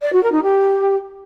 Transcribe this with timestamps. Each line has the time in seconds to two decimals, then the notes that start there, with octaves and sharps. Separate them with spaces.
0.02 D5
0.12 F#4
0.22 A#4
0.32 D#4
0.42 G4